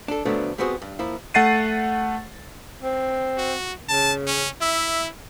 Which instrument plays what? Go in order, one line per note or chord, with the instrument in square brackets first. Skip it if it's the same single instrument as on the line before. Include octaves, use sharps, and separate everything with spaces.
[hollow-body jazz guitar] D4 A4
D3 F3 F#3 A3 B3 D4
G3 B3 C4 F#4 G#4
G2
F3 A#3 E4
[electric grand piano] A3 F#5 A6 C7 D#7
[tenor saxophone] C4
[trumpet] F#4
[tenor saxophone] C#3 [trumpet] A5
[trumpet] C#4
[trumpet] E4 [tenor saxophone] E5